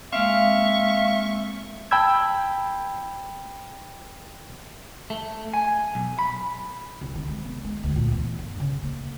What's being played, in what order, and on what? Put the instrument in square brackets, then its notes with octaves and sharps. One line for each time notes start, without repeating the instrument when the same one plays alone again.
[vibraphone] G#3 A#3 C4 [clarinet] E5 [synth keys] F5 [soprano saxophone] C#6
[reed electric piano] G5 A5 B5 E6 G#6
[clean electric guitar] A3
G#5
B1
B5
[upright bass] C2
D#3
G#3
B3
G#3
D2
A#2
E2
G2
C#3
A#3